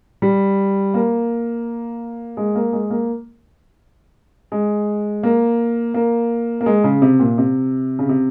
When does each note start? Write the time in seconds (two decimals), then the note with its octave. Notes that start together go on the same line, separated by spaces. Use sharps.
0.22 G3
0.94 A#3
2.37 G#3
2.55 A#3
2.73 G#3
2.90 A#3
4.52 G#3
5.23 A#3
5.94 A#3
6.61 A#3
6.66 G#3
6.84 C#3
7.02 C3
7.20 A#2
7.38 C3
7.99 C#3
8.09 C3